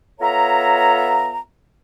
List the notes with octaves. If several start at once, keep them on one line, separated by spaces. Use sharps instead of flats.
B3 F4 A4 C#5 E5 A#5